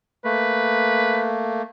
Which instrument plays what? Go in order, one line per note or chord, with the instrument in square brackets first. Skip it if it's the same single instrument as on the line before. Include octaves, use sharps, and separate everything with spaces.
[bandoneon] A3 A#3 [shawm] B4